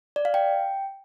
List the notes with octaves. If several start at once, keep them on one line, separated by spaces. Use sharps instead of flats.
D5
F5
G5